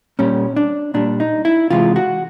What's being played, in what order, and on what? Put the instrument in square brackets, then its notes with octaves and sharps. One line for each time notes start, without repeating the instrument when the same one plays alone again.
[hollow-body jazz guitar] A#2 G3 C#4
D4
A#2 G3 D4
D#4
E4
C3 E3 G#3 F4
F#4